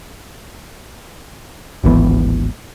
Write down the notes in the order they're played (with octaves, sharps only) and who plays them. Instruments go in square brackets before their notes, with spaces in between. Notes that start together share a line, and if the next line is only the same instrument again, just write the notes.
[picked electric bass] D1 G#1 E3 B3